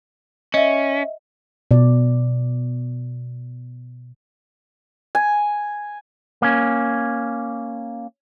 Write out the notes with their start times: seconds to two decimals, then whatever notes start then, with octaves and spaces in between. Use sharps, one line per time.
0.54 C#4 D#5 E5
1.71 B2 D5
5.15 G#5
6.42 A#3 C#4